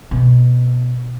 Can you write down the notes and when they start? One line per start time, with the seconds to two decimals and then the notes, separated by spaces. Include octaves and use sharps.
0.11 B2